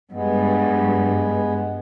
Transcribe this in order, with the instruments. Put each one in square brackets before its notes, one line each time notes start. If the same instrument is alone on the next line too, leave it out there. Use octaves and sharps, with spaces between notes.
[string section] G2 [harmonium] G#3 B3